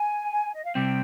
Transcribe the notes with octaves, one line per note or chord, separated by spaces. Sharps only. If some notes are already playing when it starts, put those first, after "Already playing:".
Already playing: G#5
D#5
F5
C3 G3 C4 G5